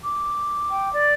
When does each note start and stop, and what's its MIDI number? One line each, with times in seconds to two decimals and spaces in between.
0.04 1.10 86
0.70 0.91 79
0.93 1.13 74